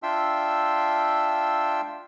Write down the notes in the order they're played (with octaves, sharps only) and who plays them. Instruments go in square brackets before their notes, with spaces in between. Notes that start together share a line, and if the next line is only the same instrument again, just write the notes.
[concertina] D4 F4 E5 G5 C6 E6